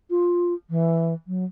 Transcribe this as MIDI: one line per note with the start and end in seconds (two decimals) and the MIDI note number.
0.10 0.54 65
0.70 1.14 52
1.27 1.44 54